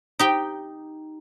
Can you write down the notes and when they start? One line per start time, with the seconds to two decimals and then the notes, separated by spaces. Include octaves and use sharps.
0.19 D#4 G4 G5